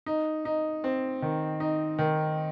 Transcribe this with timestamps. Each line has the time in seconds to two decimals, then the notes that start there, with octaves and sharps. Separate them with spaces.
0.06 D#4
0.45 D#4
0.84 C4
1.22 D#3
1.60 D#4
1.98 D#3